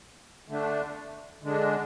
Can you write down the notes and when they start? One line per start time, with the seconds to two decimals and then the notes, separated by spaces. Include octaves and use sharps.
0.48 D3 A3 D4
1.42 D3 G#3 D4